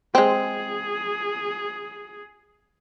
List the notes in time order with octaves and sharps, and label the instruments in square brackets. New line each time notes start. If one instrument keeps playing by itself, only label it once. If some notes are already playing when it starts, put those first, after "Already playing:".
[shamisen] G#3 C4 [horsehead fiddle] G#4